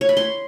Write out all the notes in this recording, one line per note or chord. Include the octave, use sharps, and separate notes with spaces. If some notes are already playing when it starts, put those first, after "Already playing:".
C#5
B5
C6